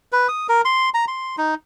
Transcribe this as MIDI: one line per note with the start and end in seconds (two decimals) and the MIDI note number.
0.12 0.28 71
0.28 0.47 87
0.49 0.61 70
0.65 0.89 84
0.94 1.05 82
1.08 1.36 84
1.38 1.55 63